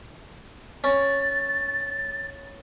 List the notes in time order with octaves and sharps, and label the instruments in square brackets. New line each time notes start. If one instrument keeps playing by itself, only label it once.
[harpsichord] C#4 [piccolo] A6